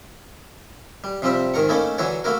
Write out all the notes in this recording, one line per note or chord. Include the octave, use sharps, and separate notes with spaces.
G3
C3 F3 G3 C4 E5 B5
G#2 D#3 A#4 A#5 C#6
A3 A#3 C#4 D#4 E4 A4
D3 E3 F#3 E4 F#4 C#5
A3 A#3 E4 F#4 A#4